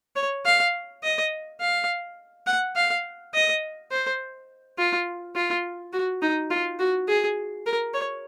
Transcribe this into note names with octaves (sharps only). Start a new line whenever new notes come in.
C#5
F5
D#5
F5
F#5
F5
D#5
C5
F4
F4
F#4
D#4
F4
F#4
G#4
A#4
C#5